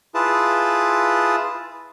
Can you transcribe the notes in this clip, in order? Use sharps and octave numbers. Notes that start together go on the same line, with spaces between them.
E4 F4 G#4 B4 A5